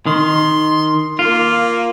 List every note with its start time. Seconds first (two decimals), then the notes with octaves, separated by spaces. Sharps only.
0.06 D#3 C6
1.19 A#3 F4